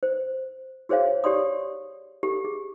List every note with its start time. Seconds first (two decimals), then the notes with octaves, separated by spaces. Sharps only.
0.03 C5
0.89 F#4 G#4 C5 C#5 F5
1.24 G4 C#5 D5 C6 D#6
2.23 G4 A4
2.45 G#4